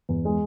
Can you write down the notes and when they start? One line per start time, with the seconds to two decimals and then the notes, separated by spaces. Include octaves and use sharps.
0.09 E2
0.25 G#3